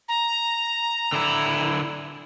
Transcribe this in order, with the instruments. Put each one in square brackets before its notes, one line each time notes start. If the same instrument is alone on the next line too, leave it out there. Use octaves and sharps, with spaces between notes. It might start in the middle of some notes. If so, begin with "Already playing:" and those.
[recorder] A#5
[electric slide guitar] D3 E4